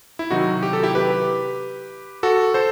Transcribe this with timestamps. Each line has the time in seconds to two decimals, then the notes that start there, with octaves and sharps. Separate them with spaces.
0.19 E4
0.30 C3 D#3 F#3 D#4 F#4
0.63 G4
0.73 A4
0.83 E4 G4
0.95 G4 B4
2.23 F#4 A4
2.54 A4 C5